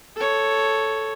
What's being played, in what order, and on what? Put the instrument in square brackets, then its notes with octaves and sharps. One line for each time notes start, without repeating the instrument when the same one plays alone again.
[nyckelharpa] A4 C#5